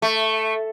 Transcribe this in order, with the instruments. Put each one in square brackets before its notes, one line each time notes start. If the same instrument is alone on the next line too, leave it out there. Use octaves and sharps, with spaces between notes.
[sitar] A3